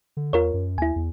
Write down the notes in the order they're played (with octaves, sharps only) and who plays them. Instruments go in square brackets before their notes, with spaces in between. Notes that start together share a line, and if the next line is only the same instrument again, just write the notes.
[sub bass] D3
[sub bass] E2 [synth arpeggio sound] F4 A#4 C#5
[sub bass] F#2
[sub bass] D#2 [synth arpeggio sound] E4 G#5
[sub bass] E2